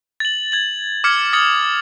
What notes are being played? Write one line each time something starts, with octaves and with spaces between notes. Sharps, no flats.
A6 F#7
G#6 F#7
D6 F6 G#6 C#7
D#6 A6 C#7 F#7